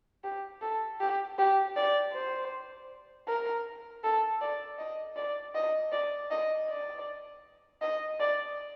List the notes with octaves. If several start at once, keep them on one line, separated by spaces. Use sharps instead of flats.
G4
A4
G4
G4
D5
C5
A#4
A4
D5
D#5
D5
D#5
D5
D#5
D5
D#5
D5